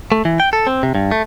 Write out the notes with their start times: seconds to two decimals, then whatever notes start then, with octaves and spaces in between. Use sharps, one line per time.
0.12 A3
0.25 E3
0.40 G5
0.53 A4
0.67 C4
0.83 C3
0.95 G2
1.11 A3